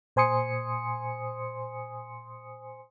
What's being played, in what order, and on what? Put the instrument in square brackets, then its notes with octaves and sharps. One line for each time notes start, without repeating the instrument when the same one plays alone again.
[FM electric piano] A#2 C5 G#5 C6 D#6 C#7